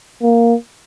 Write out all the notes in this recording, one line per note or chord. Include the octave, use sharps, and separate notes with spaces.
A#3